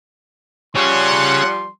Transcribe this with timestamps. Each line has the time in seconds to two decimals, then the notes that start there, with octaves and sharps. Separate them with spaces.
0.75 F3 G3 G#4 C#5 F#5 C6